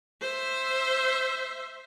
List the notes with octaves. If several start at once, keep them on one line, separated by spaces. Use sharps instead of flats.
C5 E5